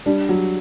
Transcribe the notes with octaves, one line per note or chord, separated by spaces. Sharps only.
G3 D4
F#3